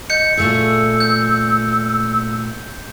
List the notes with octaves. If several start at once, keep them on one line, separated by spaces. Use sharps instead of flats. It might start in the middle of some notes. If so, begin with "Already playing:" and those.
D#5 G6 C#7
A#2 A3 G#4 E6
G6